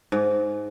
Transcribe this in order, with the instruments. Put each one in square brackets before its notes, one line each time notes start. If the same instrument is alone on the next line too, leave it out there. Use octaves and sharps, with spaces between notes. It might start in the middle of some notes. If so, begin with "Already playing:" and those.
[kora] G#2